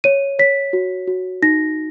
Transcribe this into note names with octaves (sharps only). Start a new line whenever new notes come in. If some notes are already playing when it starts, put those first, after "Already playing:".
C#5 D#7
C#5 B6
F#4
F#4
D#4 A#6